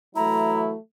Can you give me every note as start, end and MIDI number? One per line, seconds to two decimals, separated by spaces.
0.16 0.76 52
0.16 0.76 54
0.16 0.76 57
0.16 0.72 64
0.16 0.61 82